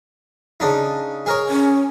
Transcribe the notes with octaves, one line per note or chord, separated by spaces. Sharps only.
C#3 D4 D#4
G#4 A#4 C#5
C#4